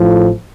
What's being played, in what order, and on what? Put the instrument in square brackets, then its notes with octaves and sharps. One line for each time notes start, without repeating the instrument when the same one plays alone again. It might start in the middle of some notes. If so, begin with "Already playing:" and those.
Already playing: [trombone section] A1 A2 F3